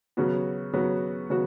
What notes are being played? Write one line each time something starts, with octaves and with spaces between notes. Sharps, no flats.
C#3 F#3 B3 F#4
C#3 F#3 B3 F#4
C#3 F#3 B3 F#4